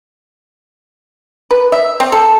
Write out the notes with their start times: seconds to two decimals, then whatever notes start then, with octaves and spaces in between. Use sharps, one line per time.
1.51 B4
1.72 E5
2.00 C4
2.12 A4